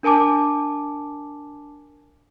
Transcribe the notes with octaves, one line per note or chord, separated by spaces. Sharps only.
D4 A#4 G#5 A5 D6